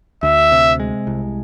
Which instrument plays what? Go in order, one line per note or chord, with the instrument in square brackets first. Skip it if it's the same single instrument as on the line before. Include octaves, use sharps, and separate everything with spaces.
[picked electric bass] D2 [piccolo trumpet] E5
[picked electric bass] C3
G#3
C2